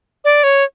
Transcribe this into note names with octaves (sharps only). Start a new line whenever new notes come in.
D5
C#5